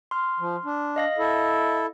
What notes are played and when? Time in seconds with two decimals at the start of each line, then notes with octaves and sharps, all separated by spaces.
0.11 C6 F6
0.40 F3
0.65 D4
0.96 D#5 F5 A#6
1.18 E4 A4